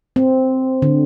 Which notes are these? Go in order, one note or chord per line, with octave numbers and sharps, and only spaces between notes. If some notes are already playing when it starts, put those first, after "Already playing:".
C4
D3